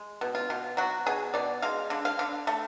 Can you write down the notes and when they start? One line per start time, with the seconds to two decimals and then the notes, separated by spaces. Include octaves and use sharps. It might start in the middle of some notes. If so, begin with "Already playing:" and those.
Already playing: G#3
0.21 B2
0.35 F4
0.50 B2
0.77 F#3 F#4
1.06 B2 G#4
1.34 B2 D5
1.62 G#3 F5
1.90 D3
2.05 F5
2.19 D3
2.47 A3